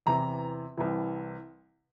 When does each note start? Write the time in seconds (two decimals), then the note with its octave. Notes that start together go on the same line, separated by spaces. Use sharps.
0.06 E2 C3 E3 A#5
0.77 C2 C3 E3